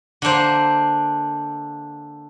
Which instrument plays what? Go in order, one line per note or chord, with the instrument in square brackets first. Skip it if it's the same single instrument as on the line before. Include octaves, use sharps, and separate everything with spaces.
[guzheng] D3 A#3 D4 C5